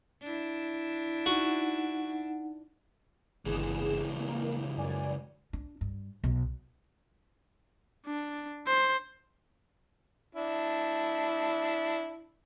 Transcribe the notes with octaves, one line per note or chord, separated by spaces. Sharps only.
D4 E4
D#4 F#4 F#5
G1 C#2 E3 G#4 E7
A#3
F#2 D5 G#5
D4
G2
B1
D4
C5
D4 E4